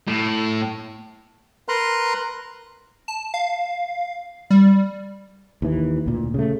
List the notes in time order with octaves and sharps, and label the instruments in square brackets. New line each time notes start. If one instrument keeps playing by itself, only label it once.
[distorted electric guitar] A2
[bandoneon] A#4 B4 A#5 C6 F#6
[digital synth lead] A5
F5
G3
[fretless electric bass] D#2 E3
D2 A#2
C#3 A3